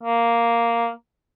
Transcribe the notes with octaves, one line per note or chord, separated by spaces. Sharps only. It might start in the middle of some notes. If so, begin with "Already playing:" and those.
A#3